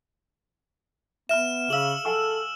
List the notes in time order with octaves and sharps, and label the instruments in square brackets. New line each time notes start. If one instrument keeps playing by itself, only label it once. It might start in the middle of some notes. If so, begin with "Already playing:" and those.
[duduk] B3 [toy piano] E5 B5 [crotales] F6 E7
[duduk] C#3 [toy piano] G#4 F5 [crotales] E6 F#7
[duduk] A4 [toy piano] F#5 G#5 C#6